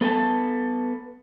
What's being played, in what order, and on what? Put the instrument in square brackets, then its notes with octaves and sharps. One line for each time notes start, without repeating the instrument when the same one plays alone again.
[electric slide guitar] B3 A4 B4 G#5 A5